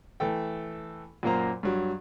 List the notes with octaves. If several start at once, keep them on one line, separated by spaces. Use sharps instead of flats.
E3 A3 A4 G5
F#2 A#2 A#3 C5 A#5
G2 F#3